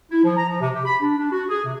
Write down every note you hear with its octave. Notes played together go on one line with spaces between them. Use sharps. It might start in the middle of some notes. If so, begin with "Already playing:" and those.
E4
F3
A#5
F3
C3
G4
B5
D4
D4
F#4
G#4
C3